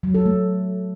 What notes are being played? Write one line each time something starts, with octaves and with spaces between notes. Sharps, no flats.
F#3
A4
A3